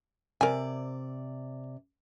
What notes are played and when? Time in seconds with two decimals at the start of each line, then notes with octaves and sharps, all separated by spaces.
0.41 C3 A#4 D5 G#5